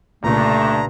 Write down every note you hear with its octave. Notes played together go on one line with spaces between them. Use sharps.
C2 G2 A#2 C#3 A3 D4 A#5